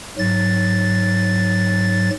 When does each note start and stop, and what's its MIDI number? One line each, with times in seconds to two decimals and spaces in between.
0.18 2.10 44
0.18 2.10 54
0.18 2.10 93